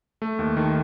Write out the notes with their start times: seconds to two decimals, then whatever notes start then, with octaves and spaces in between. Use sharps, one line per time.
0.22 A3
0.39 D#2
0.57 D#3